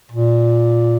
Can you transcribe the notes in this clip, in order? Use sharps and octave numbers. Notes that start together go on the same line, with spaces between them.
A#2